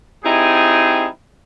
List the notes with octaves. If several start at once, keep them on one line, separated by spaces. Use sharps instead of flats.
G3 C4 D#4 E4 G#4